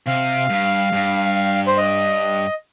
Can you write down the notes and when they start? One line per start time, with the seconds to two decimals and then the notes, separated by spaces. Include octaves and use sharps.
0.07 C3 F5
0.50 G2
0.92 G2
1.67 C5
1.77 D#5